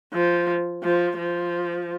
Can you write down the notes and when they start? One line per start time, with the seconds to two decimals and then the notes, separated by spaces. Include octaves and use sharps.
0.13 F3
0.83 F3
1.18 F3